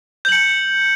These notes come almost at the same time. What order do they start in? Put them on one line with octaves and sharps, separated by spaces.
G6 F#7 C#7